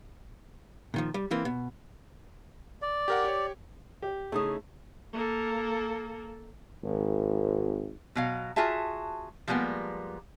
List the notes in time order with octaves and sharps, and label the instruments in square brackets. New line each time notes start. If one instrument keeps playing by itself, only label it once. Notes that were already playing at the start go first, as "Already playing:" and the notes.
[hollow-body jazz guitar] A#2 D#3 F3
G3
E3 A#3 C4
B2
[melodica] D5
[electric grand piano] G4 A#4 F#5
G4 C#5
[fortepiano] G4
[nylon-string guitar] C#3 D#4 E4 [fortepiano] A3 [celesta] G#4 D#6
[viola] A#3 A4
[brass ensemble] G#1
[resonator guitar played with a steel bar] B2 F#3 F5
F4 F#4 G#4 E5 A5
F3 G3 G#3 A#3 B3